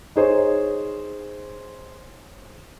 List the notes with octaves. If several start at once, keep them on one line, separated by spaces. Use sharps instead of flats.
D#4 G#4 C5 C#5